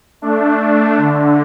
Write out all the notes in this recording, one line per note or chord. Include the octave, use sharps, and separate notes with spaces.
A3 D4
A3 D4
D3